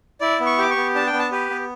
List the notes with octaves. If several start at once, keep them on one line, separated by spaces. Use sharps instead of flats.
E4 D5
B3
C#6
G4 D6
C#6
B3
D4 A5
G5
B3
A5
G4 B4
B3